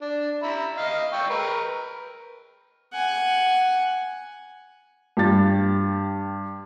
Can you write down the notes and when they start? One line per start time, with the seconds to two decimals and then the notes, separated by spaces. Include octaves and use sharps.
0.01 D4
0.43 E5 A#5 B5
0.77 D#5 F5
1.13 G5 C#6 E6
1.30 A#4 B4
2.93 F#5 G#5
5.17 G2 G4 A6